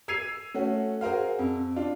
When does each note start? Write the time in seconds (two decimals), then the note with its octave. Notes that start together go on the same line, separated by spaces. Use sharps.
0.08 E6 G#6 C7 D#7 F7
0.54 A3 C#4 F#4
1.01 F#4 G#4 A#4 C5 F5
1.39 F2
1.76 D4 F4